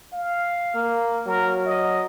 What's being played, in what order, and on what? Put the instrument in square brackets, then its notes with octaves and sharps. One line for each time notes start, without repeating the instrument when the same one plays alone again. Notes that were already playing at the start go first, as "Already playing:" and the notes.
[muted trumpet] F5
[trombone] A#3
[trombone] F#3 [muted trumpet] A#4
[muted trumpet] D#5